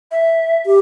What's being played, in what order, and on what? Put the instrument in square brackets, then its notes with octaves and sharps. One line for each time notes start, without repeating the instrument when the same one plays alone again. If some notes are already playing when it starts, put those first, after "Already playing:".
[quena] E5
[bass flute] G4